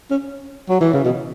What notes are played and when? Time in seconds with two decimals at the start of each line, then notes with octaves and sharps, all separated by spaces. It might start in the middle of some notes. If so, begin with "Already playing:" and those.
0.10 C#4
0.70 F#3
0.81 E3
0.93 C#3
1.04 B2